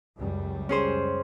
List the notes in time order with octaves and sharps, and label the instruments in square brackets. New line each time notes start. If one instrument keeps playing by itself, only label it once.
[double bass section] C#2 F#2 G3
[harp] C#4 G#4 C5